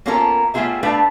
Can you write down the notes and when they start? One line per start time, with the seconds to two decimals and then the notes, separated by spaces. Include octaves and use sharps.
0.06 A#3 B3 C#4 F4 A4 A#4
0.54 G3 A3 B3 F4 G#4 E5
0.83 A3 D4 A4 B4 F5